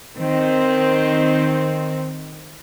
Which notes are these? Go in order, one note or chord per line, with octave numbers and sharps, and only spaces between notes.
D#3 C4